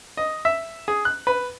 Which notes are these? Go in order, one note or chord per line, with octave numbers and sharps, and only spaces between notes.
D#5
E5
G#4
F#6
B4